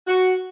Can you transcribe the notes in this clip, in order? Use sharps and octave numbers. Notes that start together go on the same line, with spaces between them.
F#4